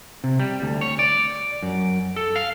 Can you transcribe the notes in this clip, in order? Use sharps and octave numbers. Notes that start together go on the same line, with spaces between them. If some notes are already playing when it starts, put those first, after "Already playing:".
C3
G3
D2
C#5
D5
F#2
A4
F5